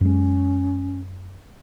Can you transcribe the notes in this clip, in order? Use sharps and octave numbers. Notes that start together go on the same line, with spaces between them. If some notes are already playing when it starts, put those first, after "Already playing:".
F#2 G#3 C#4